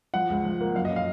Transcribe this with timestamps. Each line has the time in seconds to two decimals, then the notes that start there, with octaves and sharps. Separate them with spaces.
0.14 F3 F#5
0.30 C#2
0.45 F3
0.61 A#3
0.75 F#2 F5
0.85 D#5
0.90 C#4
0.96 F5